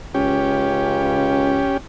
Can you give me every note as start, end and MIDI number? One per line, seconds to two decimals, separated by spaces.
0.14 1.65 37
0.14 1.77 61
0.14 1.77 67